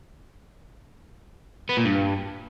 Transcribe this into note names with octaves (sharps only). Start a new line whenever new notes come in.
B3
A#2
G2